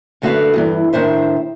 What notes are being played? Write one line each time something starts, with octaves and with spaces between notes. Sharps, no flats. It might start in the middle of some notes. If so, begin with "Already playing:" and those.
F#2 D3 A3 F#4 B4 F5
E2 G2 E3
A2 D#3 D4 C5 E5